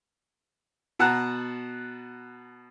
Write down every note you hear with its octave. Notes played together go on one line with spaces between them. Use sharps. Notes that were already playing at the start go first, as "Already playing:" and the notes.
B2 F#5 A5 A#5